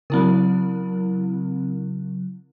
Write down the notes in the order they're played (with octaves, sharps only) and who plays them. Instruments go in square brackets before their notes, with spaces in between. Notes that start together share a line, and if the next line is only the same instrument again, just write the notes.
[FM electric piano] C#3 F#3 [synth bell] C4 E4 A#4